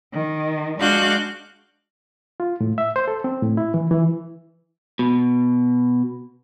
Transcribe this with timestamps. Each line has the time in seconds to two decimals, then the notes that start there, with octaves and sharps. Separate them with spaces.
0.12 D#3
0.77 G#3 D4 F#4 F5 F#6 G6
2.40 F4
2.61 A2
2.78 E5
2.96 C5
3.08 A4
3.24 C4
3.42 A2
3.57 E4
3.74 E3
3.91 E3
4.99 B2